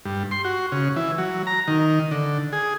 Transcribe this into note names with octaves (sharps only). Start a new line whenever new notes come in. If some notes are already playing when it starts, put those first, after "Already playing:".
G2
C6
F#4
C#3
E3
F#3
A#5
D#3
D3
G#4